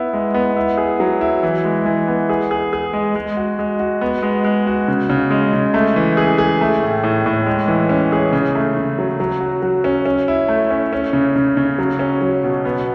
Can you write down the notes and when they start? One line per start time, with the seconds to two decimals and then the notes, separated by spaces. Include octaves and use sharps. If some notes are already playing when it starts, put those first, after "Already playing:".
Already playing: B3 E4
0.13 G#3
0.34 B3
0.56 E4
0.78 G#4
1.00 F#3
1.21 E4
1.43 E3
1.65 G#3
1.86 E3
2.07 B3
2.29 G#4
2.51 G#4
2.73 G#4
2.93 G#3
3.15 G#3
3.37 F#4
3.59 G#3
3.80 F#4
4.01 B3
4.23 G#3
4.44 G#3
4.67 F#4
4.88 C#3
5.10 C#3
5.31 G#3
5.53 C#3
5.74 A3
5.96 E3
6.17 G#4
6.38 G#4
6.61 A3
6.83 A2
7.03 A2
7.26 A2
7.46 G#3
7.68 E3
7.89 C#4
8.12 G#4
8.33 C#3
8.55 A3
8.77 C#3
8.98 F#3
9.20 F#3
9.40 F#4
9.62 F#3
9.84 C#4
10.06 C#4
10.28 E4
10.48 A3
10.71 C#4
10.93 C#4
11.13 C#3
11.36 C#3
11.57 C#3
11.78 F#3
11.99 C#4
12.21 F#3
12.43 B2
12.65 B3